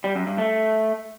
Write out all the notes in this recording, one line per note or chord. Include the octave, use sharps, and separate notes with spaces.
G3
F#2
G2
A3